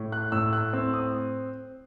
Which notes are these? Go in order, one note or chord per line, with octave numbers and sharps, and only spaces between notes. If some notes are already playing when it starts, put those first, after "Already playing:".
Already playing: A2
F#6
A2 E6
F#6
C4 E6
D#6